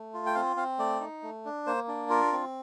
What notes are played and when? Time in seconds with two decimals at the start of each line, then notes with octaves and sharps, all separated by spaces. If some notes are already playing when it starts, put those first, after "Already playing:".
Already playing: A3
0.14 F4
0.26 G5
0.35 C4 F5
0.56 C4 F5
0.79 A3 D5
1.01 D#4
1.23 A3
1.45 D4
1.66 A#3 C5
1.88 D4
2.10 F4 A#4
2.32 C4